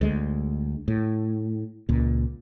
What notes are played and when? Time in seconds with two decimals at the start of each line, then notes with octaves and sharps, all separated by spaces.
0.01 D2 G#3
0.88 A2
1.89 C#2 A#2